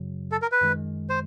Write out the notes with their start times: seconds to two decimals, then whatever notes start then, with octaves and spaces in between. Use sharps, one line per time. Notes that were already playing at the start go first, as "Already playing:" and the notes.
Already playing: F#2 C#3 F#3
0.32 A4
0.42 A#4
0.52 B4
0.61 F#2 D#3 G#3
1.10 C5